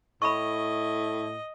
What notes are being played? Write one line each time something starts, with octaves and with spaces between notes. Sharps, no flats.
A2 D#5 B5 C#6